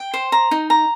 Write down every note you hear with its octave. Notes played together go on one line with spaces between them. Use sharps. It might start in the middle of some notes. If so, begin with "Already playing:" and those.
Already playing: G5
C5
A#5
D#4
A#5